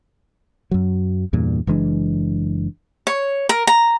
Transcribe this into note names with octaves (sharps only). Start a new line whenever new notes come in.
F#2 F#3
E2 G2 A#2
F#1 E3 G#3 D4
C#5
A#4
A#5